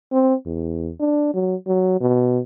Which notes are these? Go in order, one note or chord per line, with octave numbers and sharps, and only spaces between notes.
C4
E2
D4
F#3
F#3
B2